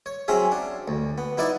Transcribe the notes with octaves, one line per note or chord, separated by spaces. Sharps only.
C#5
F#3 C4 C#4 G#4 E5
D4
D2
B3
B3 D#4 E4 D5 C#6